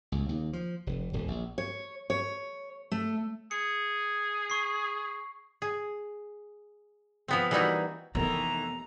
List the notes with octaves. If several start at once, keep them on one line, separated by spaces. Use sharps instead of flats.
C#2
D#2
F3
F1
D1
A#1
C#5
C#5
A3
G#4 C#7
C#6 C7
G#4
F3 B3 C4
E3 G3 A#3 D#4 E4 F#4
F1 D#3 E3 A3 B3 A#4 A#5